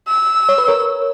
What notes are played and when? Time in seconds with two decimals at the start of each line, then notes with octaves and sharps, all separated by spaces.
0.08 E6
0.49 C#5
0.58 B4
0.68 A#4 C#5